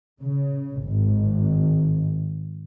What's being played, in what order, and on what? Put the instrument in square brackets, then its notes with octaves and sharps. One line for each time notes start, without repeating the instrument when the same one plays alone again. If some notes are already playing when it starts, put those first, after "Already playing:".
[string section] C#3
G#1